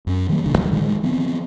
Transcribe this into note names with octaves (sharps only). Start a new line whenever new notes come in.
F#2 C#4
D#3 F#3 G3 A#3
D#1 B2 D3 D4
A1 D2 F3 F#3
A2 D3 D#3 G#3
F3 B3 C4